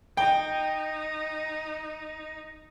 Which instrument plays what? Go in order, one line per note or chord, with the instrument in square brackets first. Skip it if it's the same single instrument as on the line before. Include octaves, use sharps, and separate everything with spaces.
[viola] D#4 [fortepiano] G5